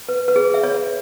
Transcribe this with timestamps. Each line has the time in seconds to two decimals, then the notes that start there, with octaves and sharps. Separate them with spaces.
0.09 B4
0.28 B4
0.36 G#4
0.54 E5
0.63 C#5